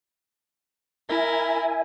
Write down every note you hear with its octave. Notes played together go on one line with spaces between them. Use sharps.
E4 A#4 E5 G#5